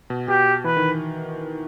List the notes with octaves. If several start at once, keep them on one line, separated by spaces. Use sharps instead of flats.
B2
B2 G4
E3 B4
D#3